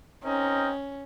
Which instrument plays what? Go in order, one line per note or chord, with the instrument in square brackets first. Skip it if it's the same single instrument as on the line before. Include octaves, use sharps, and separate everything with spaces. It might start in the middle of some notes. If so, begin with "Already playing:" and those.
[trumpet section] C4 D#4 A#4 D#5 G5 [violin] C#4